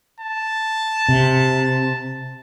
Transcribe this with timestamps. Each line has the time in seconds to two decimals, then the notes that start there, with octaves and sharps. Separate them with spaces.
0.21 A5
1.09 C3